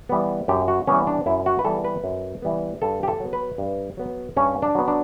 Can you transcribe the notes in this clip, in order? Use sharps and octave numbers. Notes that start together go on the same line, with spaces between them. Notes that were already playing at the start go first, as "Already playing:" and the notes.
E3 G3 B3
F#2 G4
F#4
E3 G3 B3 C#4
D4
F#2 E4
F#4
B4
E3 G3 B3 A4
B4
F#2
E3 G3 B3
G2 A4
G4
A4
F#3 B3
B4
G2
F#3 B3
G2 C#4
D4
F#3 B3
D4